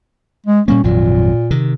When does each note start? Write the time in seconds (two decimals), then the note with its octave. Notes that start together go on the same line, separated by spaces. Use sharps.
0.46 G#3
0.68 A#2 G3 A#3 C#4
0.83 G#1 F2 A#2 F#3
1.51 C3 D#3